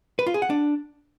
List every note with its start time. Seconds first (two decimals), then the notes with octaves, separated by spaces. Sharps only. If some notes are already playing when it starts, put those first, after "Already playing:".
0.19 B4
0.27 F4
0.34 G#4
0.42 F#5
0.50 D4